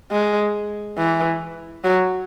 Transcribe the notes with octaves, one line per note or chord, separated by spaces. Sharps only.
G#3
E3
F#3